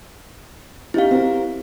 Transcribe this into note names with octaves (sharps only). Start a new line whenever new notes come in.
C#4 D#4 E4 G4 F5
C4 F#4 A#4